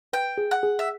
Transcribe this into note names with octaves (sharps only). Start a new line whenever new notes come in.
B4 G5
G#4
F#5
G#4
E5